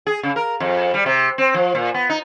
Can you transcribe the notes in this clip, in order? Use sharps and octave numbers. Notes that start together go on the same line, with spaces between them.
G#4
C#3
A#4
F2
G3
C3
C4
F3
A#2
B3
D#4